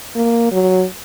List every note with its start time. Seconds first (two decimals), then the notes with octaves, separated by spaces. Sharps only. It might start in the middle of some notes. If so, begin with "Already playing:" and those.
0.15 A#3
0.52 F#3